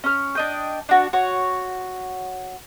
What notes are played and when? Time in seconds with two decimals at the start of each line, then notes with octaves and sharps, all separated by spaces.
0.04 C#4 F6
0.35 D4 D#5 G5
0.89 D4 F#4
1.13 F#4 C#5